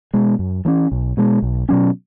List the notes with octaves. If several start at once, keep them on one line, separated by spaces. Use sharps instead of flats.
B2 G#3
F#2
E3 A3 C#4
B1
B2 G#3
B1
B2 F#3 C#4